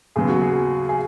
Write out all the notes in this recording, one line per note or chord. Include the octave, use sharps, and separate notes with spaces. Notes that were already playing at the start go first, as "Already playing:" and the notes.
D#2 C#3 F#3 B3 G#4
F#4
G#4
G#4